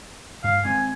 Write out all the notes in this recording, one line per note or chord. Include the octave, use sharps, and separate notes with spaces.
G2 F5
G#3 C4 G#5